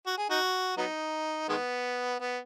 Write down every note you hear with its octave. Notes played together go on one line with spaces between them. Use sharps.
F#4
G#4
D#4 F#4
F#3 B3 D#4
D#3 G#3 B3
B3